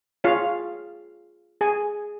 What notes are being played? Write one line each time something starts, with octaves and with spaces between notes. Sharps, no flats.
F4 G#4 C#5 F5
G#4 G#5